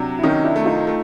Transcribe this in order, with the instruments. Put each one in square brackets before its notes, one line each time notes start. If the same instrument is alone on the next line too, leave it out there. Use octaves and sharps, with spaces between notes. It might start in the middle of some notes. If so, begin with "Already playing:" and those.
Already playing: [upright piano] C3 F#3 [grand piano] D4
[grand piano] E4
[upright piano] D#3 [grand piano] C#4 D#4
[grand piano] D4 E4
[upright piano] A3
[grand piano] D#4 F4
[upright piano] A3